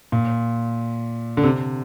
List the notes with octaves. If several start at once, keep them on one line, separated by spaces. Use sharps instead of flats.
A#2
D3
C3